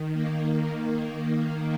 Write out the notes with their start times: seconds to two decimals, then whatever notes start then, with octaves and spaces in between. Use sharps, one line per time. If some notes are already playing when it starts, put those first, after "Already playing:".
Already playing: D#3
0.13 A#3